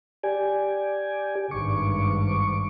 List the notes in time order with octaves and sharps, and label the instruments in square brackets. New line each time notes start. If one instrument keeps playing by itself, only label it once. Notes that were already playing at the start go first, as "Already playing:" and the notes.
[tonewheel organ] G4 D5 G#5
[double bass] G#1 G2 [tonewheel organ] C#6 D6